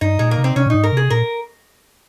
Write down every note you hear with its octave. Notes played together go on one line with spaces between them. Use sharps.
G2 D#4
A#2 G#3
A#3
C3
C4
C3 C#4
A#2
G#2 D#4
A#4
C3 G#4
A#2 A#4